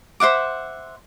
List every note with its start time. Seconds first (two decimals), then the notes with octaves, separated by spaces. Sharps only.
0.20 C5 E5 F#5 D6